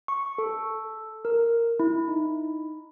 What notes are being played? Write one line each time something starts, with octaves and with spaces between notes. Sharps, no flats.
C#6
A4
A#4
E4
D#4